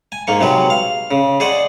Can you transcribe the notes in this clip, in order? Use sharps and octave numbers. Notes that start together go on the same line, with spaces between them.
G#5
G#2 A#3 C#6
C3 F#3 G#3 B4
F5
C#3
G#4 C5 D5 D#5 F#5